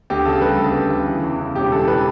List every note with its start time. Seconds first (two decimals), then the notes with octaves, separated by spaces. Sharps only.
0.10 D2 G4
0.25 C#3 A4
0.42 G3 B4
0.58 D2 A4
0.74 D2
0.90 C#3
1.07 E3
1.24 E2
1.39 C#3
1.55 E1 G4
1.72 E3 A4
1.88 B4